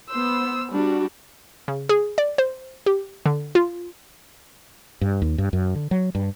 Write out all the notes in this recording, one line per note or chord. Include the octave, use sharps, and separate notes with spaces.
B3 C5 E6
G3 D4 F#4
C#3
G#4
D5
C5
G4
D3
F4
G2
D#2
G2
F#2
D3
F#3
G2